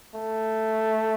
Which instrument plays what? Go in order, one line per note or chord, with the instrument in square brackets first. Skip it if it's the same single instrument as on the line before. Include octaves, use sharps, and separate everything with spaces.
[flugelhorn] A3